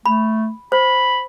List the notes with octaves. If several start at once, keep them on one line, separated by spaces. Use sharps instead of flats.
A3 B5
C5 B5